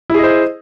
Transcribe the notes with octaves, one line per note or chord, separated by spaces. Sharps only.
E4 G#4 C5 D#5